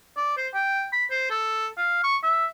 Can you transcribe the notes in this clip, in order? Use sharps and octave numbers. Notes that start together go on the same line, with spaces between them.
D5
C5
G5
B5
C5
A4
F5
C#6
E5